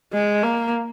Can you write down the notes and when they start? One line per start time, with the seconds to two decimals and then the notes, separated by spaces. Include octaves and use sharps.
0.13 G#3
0.43 A#3